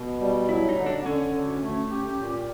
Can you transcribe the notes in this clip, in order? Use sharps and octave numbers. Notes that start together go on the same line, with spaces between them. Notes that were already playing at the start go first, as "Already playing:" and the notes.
Already playing: B2
G3
F#3 E4
D#4
D3
D4
D3 C#4
D2
A3
G4
A#2